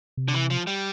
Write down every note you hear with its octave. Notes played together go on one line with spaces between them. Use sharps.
C3
D3
E3
F3
G3